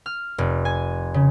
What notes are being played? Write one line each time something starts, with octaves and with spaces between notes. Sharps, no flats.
F6
F1
G#5
C#3